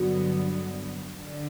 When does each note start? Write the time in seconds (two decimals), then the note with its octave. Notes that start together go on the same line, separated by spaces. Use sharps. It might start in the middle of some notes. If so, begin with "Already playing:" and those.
Already playing: G2 D3 F#3 B3 F#4
1.18 D3